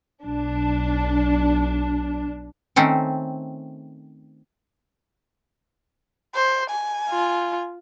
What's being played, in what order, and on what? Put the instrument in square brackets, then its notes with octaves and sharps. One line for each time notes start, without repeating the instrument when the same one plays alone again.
[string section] B1 D4
[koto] D#3 A3 C4 C#4
[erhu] C5
G#5
[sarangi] F4